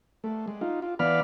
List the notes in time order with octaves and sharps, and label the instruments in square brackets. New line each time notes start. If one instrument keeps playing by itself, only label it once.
[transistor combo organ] A3
G#3
D#4 F4
F4
E3 B3 D5 F5 B5 F6